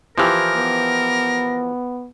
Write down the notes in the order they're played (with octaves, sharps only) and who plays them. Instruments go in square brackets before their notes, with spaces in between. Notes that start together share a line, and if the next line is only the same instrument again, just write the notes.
[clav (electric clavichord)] E3 F3 [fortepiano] E4 G4 F6 [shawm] A#4
[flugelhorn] B3